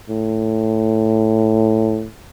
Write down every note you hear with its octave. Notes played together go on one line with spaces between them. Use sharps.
A2